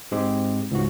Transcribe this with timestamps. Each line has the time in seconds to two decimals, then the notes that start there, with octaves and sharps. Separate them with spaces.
0.12 G#2 G#3 C4 G4
0.71 C#2 G#2 F#4